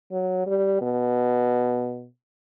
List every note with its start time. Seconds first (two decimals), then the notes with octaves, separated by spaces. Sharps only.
0.12 F#3
0.47 G3
0.81 B2